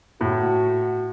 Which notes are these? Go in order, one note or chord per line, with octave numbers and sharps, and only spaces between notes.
A2 F#4